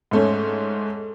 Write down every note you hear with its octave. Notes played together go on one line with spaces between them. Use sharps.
G#2 A3 C#4